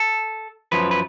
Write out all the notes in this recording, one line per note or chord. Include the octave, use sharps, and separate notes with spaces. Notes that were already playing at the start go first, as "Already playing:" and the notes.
Already playing: A4
F#2 F3 B4
B4